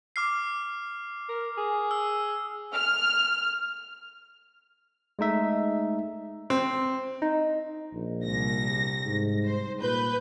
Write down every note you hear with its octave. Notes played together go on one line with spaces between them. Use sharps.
D6 F6 C7
A#4
G#4
E6
F6
G#3 A3 D#4 E5
C4
D#4
A#1
C2 A#6
G#2
C5
A#2 B4 G6